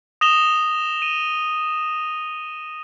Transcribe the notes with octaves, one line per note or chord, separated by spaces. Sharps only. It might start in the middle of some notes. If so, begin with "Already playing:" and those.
D#6 A#6 E7 F7 G7
D#7